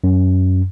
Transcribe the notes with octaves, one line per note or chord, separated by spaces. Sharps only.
F#2